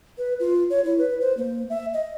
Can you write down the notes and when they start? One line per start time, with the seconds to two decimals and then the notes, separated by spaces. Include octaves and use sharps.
0.18 B4
0.40 F4
0.70 C#5
0.84 E4
0.98 B4
1.21 C5
1.37 A#3
1.70 E5
1.93 D#5